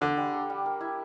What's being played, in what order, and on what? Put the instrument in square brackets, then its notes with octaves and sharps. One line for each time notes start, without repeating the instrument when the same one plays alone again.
[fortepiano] D3 [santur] D4
[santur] G3
A4
G3
A#4
E4